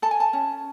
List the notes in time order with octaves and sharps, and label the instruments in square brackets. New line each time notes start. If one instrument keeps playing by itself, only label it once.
[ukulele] A4 A5
G#5
A5
C#4